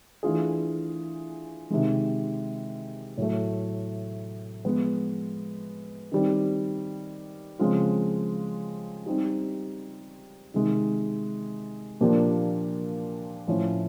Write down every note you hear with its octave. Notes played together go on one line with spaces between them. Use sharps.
E3 A3 D4 F4 G#4
C3 D#3 G#3
A2 F#3 A3
F3 G#3 B3
D#3 G3 C4
C#3 F3 G#3 C4 F4
G3 C4 D#4 G4
C3 D#3 G#3
A#2 F3 A#3 D4 G4
A2 F3 A3 C#4 E4